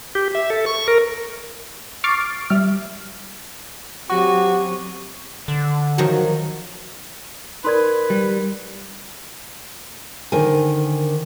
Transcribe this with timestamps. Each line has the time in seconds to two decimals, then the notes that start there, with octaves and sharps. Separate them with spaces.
0.15 G4
0.35 E5
0.50 A4
0.66 C#6
0.88 A#4
2.04 C#6 D6 F6 A6 C7 D7
2.50 G3 E5 F6
4.10 F#3 C4 F#4 G4 C#6
5.48 D3
5.98 D#3 F3 F#3 F#4
7.64 D#4 A#4 B4 D5 B5 C6 G#6
8.10 G3
10.32 D3 D#3 A#4 C5 G#5